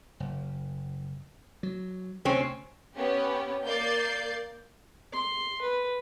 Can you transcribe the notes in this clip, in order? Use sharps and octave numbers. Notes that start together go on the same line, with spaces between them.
F#1
F#3
D2 C3 C4 C#4
B3 C#4 G4
A#3 D5 G6 A6 C7
C6
B4